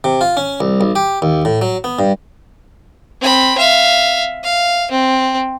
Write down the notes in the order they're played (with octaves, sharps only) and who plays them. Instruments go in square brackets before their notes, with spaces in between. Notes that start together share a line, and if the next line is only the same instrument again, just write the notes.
[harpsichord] C3
F4
C#4
C2
B1
G4
D#2
A2
F#3
B3
G2
[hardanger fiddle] C4 B5
E5 F5
F5
C4